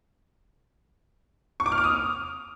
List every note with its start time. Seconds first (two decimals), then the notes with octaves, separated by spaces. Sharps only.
1.60 C#6
1.66 D6
1.72 F6
1.78 D6
1.84 D#6